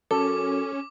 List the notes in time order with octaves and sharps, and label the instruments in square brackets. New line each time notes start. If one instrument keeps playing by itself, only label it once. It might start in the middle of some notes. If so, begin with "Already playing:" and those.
[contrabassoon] F#2 [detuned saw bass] C#4 [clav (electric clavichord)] A4 [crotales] D6